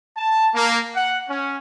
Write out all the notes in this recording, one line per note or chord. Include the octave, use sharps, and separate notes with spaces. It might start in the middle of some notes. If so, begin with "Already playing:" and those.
A5
A#3
F#5
C#4